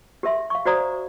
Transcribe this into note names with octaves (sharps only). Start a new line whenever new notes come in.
G4 A#4 E5 C6
F5 C#6
F#4 C5 D5 A#5 D#6